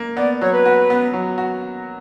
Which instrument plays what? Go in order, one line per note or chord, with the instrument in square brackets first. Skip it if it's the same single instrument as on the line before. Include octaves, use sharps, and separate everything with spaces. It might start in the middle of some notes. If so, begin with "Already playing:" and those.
Already playing: [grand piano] A#3
[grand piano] B3 [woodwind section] D5
[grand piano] F#3 [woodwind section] C#5
[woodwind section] B4
[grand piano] F#4
B3
F#3
F#4